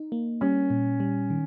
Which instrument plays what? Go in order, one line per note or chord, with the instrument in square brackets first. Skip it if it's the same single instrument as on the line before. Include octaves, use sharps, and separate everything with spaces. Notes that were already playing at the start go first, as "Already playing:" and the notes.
Already playing: [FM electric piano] D#4
A#3
[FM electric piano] G3 [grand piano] C#4
[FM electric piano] A#2
G3
D#3